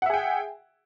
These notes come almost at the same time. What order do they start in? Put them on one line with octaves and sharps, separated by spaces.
F#5 E5 G#4 G5